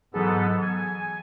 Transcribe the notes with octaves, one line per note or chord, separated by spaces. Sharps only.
G#2 E3 F#3 B3 G#4 A4
G#5